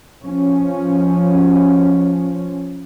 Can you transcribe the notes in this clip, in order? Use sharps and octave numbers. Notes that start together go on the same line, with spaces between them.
F3 C#4